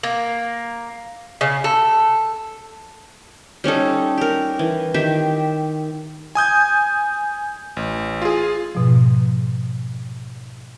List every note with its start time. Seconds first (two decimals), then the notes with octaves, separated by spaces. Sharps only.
0.03 A#3
1.41 C#3
1.64 A4
3.64 G3 C#4 D#4 A4
4.18 G4 A#4
4.59 E3
4.94 D#3 G4 E5
6.35 G#5 D#6 G6 G#6
7.77 A1
8.22 F4 G#4
8.75 G#2 B2 F3